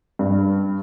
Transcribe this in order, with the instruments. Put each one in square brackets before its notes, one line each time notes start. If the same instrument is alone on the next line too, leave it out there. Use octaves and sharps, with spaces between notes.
[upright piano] G2